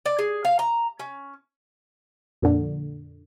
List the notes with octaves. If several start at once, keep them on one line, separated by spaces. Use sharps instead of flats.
D5
G#4
F5
A#5
C#4
F2 A#2 D3